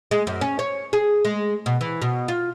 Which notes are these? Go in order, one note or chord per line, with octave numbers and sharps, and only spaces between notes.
G#3
F#2
C#4
C#5
G#4
G#3
B2
E3
B2
F4